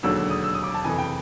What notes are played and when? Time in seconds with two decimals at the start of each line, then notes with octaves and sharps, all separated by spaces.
0.03 E1 D#2 D3 F#3 E6
0.17 E6
0.30 D#6
0.44 E6
0.54 D#6
0.64 D6
0.74 A5
0.84 F2 C3 E3 G#5
0.98 G5